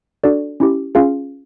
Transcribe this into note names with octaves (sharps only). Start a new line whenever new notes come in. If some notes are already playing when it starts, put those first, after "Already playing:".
D4 F#4 A4 D5
C#4 E4 G4
C#4 F4 G#4 F5